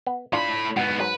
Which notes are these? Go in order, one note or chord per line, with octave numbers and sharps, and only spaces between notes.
B3
A2 D4 F4 B5
G#2 B3 F#4
G#2 F#3 B4